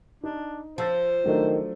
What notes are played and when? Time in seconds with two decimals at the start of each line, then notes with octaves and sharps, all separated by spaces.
0.23 D4 D#4
0.78 F3 C5 A5 E6 A6
1.26 D#3 F#3 A3 D4